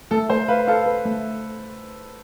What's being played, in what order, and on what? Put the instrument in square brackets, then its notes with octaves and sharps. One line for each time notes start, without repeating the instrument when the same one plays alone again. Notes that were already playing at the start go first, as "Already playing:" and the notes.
[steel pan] A3 [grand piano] A4
[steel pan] A3 [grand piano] C5
[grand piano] B4 [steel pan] F5
[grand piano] A4 [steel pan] F5
[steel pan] B4
A3